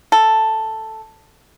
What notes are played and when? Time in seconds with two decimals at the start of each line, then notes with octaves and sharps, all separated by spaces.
0.12 A4